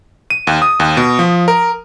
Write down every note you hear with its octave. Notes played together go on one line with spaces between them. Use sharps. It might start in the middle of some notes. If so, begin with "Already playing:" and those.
D#7
D#2
D#6
D#2
B2
F3
A#4